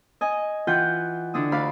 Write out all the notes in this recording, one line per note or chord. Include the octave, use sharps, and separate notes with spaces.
D#5 G#5
E3 F4 F#5 G5 G6
D3 D4 E4 D#6
D2 D5 F5 B5